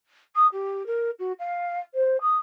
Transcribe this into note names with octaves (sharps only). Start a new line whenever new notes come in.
D#6
G4
A#4
F#4
F5
C5
D#6